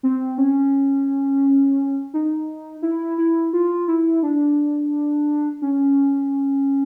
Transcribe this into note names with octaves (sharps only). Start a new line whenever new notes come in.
C4
C#4
D#4
E4
E4
F4
E4
D4
C#4